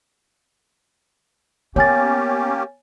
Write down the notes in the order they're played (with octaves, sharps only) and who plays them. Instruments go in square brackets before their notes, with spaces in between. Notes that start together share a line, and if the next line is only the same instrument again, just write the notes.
[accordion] A#3 C#4 G4 [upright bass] B3 [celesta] C#5 G#5 A6